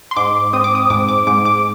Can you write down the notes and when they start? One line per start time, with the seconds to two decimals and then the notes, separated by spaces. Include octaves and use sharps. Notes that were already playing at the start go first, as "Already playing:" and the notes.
0.11 C6
0.16 G#2 D6
0.53 C4 D#6
0.64 D6
0.75 D#6
0.90 G#2 D6
1.09 D6
1.27 G#2 D6
1.45 D6